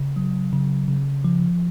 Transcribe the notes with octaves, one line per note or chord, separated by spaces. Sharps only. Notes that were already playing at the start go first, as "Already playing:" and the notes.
Already playing: C#3
F#3
C#3
C#3
F3